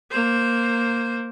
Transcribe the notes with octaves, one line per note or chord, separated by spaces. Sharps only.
A#3 C5